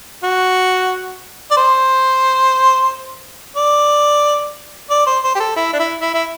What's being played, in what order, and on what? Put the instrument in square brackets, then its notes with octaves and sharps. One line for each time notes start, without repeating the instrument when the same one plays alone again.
[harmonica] F#4
D5
C5
D5
D5
C5
C5
G4
A4
E4
D4
E4
E4
E4